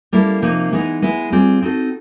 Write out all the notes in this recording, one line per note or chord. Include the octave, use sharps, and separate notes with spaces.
G3 A#3 C#4 E4 A4
C3 F3 A#3 D#4
E3 G#3 B3 D#4
G#3 B3 E4
G3 C4 F4 G#4
C4 D#4 F#4 A4